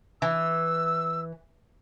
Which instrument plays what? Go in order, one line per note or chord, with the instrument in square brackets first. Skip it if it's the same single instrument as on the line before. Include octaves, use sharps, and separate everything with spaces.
[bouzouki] E3 [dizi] E6